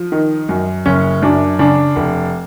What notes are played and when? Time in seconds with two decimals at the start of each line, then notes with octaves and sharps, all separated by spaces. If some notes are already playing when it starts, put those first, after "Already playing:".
Already playing: F3
0.12 D#3
0.49 F#2
0.86 F#1 C#4
1.22 F#2 D4
1.59 C#3 D4
1.96 F1